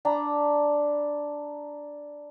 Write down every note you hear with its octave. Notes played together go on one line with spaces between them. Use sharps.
D4 A#5 B5